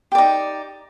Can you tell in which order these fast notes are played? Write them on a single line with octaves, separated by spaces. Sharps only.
G4 D5 D#4